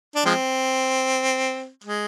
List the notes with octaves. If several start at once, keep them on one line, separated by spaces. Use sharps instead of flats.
D4
F3 G#3 C4
G#3